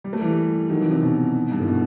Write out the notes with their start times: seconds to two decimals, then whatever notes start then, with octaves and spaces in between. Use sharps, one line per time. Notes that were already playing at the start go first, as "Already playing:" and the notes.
0.04 G3
0.13 A3
0.21 E3 G3
0.69 D#3 F#3
0.80 C3 E3
0.91 C3 E3
1.02 B2 D#3
1.51 G2
1.60 A2
1.68 B2